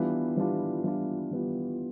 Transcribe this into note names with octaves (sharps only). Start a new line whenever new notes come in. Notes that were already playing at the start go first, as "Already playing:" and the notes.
Already playing: E3 G3 B3 D4 F4
E3 G3 B3 D4 F4
E3 G3 B3 D4 F4
E3 G3 B3 D4 F4